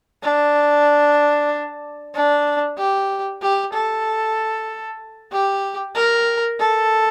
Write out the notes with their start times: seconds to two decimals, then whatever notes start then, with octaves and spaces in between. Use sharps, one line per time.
0.22 D4
2.14 D4
2.77 G4
3.42 G4
3.73 A4
5.31 G4
5.95 A#4
6.59 A4